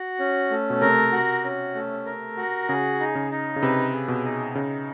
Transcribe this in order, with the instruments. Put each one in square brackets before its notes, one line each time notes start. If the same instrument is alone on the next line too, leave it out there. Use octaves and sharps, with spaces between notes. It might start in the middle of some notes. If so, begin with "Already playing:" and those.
Already playing: [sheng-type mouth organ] F#4
C#4
A3
[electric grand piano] B2
[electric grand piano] C3 [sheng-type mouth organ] A#4
[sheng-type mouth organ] F#4
C#4
A3
A#4
F#4
[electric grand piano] C#3 [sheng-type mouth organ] G#4
[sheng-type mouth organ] D#4
[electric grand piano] C#3
[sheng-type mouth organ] D#4
[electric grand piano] C#3
[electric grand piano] C3 [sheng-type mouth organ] B4
[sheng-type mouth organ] G#4
[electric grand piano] B2
[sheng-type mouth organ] D#4
[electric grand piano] C#3 [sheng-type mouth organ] D#4